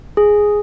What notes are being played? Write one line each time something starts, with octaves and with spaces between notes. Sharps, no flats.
G#4